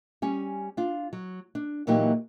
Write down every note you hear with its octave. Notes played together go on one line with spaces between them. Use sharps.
G3 C#4 G#5
D4 F4
F#3
D4
A#2 E3 F#3 A#3 D#4 G4